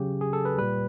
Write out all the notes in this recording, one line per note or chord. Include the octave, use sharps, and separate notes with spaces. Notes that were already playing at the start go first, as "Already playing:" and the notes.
Already playing: C#3 F#3 G4
G#4
A4
B4
A#2 G3 B4